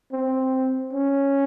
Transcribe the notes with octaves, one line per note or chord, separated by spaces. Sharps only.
C4
C#4